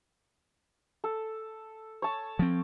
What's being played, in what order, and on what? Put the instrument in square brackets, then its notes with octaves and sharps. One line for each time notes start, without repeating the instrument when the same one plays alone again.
[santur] A4
C#5 A5
[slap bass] F3 C4